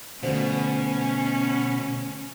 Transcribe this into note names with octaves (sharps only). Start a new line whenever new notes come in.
D2 B2 D3 F3 C#4